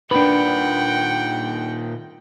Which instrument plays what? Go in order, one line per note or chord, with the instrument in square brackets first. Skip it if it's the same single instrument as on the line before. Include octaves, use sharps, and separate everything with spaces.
[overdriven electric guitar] A#2 D#3 [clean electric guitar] D4 B4 [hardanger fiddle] F#5 G5